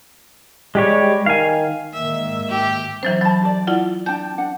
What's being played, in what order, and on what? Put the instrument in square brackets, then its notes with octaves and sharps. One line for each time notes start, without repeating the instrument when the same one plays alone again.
[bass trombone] G3 [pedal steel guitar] G#3 G4 C#5
[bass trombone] D#3 [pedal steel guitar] F5 G#5
[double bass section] G#2 D#3 A#3 [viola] E5
[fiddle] G4
[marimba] E3 F#3 C5 [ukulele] C#4 D#4
[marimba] F#3 [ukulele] A5 B5
[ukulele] D#4 G4 D5
[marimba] E4 F4 F#5 [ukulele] D5
[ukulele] D4 G5 A5 [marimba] G6
[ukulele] D4 F#5